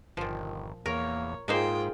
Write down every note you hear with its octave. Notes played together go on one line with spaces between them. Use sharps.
G1 A#2 D#3 F3
E2 A#3 A#4 C#5
G#2 A#3 D#4 F4 G#4 C5 G5